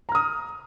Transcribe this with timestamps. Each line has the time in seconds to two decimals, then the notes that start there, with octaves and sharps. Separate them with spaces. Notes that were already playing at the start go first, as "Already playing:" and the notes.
0.09 A#5
0.12 F6
0.15 D#6